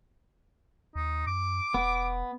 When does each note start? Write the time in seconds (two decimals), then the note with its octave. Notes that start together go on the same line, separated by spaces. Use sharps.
0.95 D#2 D#4
1.26 F#2 D6
1.74 E1 B3